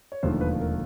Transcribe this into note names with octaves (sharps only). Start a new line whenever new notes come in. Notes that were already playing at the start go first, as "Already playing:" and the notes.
C#5
E1 D#2 D3 F3 A3 C5
B4
A#4